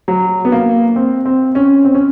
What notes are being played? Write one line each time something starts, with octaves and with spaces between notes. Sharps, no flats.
F#3
B3
A#3
C4
C4
C#4
C4
C#4